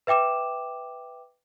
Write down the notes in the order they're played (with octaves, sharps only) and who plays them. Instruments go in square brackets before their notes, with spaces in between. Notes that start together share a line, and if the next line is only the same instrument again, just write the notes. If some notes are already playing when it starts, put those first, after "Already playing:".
[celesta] B4 E5 G5 D6 E7